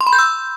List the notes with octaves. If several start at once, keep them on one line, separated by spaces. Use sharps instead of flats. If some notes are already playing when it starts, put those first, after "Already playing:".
C6
B5
G6
E6